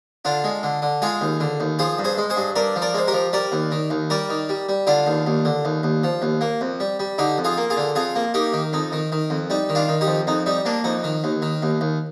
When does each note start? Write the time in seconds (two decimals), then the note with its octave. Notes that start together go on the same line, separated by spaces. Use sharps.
0.25 D3 D4 F4
0.44 G#3
0.63 D3
0.82 D3
1.02 G#3 F4 G#4
1.21 D#2
1.40 D3
1.60 D#2
1.79 F3 G#4 C5
1.99 G2
2.04 G#4 C5
2.18 G#3
2.30 G#4 C5
2.37 G2
2.56 G2 A#4 D5
2.76 F3
2.82 A#4 D5
2.94 G#3 C5
3.08 G4 A#4
3.13 F3
3.33 G3 A#4 D5
3.52 D#2
3.71 D#3
3.90 D#2
4.10 G3 A#4 D5
4.29 D#3
4.49 G3
4.69 G3
4.87 D3 D4 F4
5.07 D#2
5.26 D#2
5.45 D3
5.65 D#2
5.83 D#2
6.04 F3
6.22 D#2
6.41 A#3
6.61 F2
6.80 G3
6.99 G3
7.18 D3 D#4 G4
7.38 F2
7.44 F4 G#4
7.57 A#3
7.70 F4 G#4
7.77 D3
7.95 F2 F4 G#4
8.16 A#3
8.34 A#3 D#4 G4
8.53 D#3
8.73 F2 D#4
8.92 D#3
9.12 D#3
9.30 F2
9.50 G3 D#4
9.69 D#3
9.75 D4 F4
9.88 D#3
10.01 D#4 G4
10.07 F2
10.27 F2 D#4
10.46 G3 D#4
10.65 A#3 D4
10.84 F2 D#4
11.04 D#3
11.24 D#2
11.42 D#3
11.62 D#2
11.81 D#2